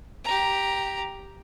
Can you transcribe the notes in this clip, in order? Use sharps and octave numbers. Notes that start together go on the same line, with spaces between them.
G4 A#5